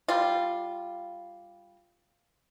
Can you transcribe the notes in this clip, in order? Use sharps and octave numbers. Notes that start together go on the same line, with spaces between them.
G3 F4